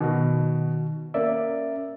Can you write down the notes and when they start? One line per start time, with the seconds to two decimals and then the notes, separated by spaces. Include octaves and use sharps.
0.01 B2 D#3 F#4
1.14 A#3 C#4 D5 E5